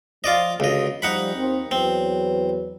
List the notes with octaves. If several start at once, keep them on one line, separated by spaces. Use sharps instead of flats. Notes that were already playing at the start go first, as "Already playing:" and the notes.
F3 F4 D5 D#5
C#2 D3 F4 F#4 D#5
F3 G3 D#4 F#5 B5
D#2 C4
E2 F#3 C4 B4